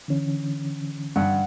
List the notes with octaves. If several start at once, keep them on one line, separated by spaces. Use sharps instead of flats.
D3 E3 C#4
G2 F#5